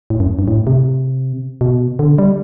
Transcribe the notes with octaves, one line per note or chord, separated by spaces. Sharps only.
A2
F#2
G2
A2
C3
B2
D3
G3